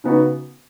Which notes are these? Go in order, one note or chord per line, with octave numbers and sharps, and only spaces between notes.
C#3 B3 D#4 F#4